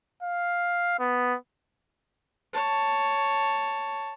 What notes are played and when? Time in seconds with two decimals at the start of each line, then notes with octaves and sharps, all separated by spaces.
0.22 F5
0.99 B3
2.53 C#5 A5